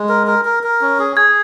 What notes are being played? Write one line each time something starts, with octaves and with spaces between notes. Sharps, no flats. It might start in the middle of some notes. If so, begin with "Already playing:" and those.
Already playing: G#3
A#4
A#4
A#4
A#4
C#4
G#4
G#4 G#6